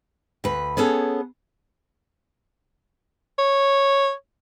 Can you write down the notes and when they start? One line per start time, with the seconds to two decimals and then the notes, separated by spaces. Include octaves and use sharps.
0.44 D2 B4
0.77 B3 C#4 G#4 A4
3.38 C#5